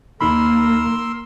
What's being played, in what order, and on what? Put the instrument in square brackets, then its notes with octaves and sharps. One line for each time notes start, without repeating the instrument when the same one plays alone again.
[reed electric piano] D#2 D#4 B5 [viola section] A#3 [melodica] A#4 C6 E6